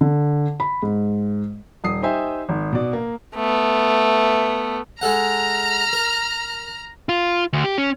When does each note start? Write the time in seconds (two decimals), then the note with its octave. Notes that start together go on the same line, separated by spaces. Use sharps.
0.01 D3
0.60 B5
0.83 G#2
1.84 D#1 D#6 C7
2.02 D#4 G4 C5 E5 G#5
2.49 G#1
2.73 B2 D5
2.93 A#3
3.35 A3 B3
5.01 G#3 A4 F#5 A#5 F6
5.93 A#4
7.09 F4
7.53 D2
7.64 G4
7.78 C#4